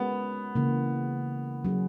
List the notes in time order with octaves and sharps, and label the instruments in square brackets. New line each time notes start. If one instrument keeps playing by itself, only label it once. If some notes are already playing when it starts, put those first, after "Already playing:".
Already playing: [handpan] G#3 C#4 F#4 A#4 [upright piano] B3
[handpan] C#3 E3 A#3
F#3 C#4 G#4